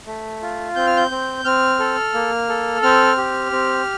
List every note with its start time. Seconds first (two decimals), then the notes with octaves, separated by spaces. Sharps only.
0.06 A3
0.42 F4
0.75 C4 G6
0.87 F6
0.97 G6
1.11 C4
1.45 C4 F6
1.79 A4
2.14 A#3
2.49 A4
2.83 C4 F6
3.17 G4
3.52 C4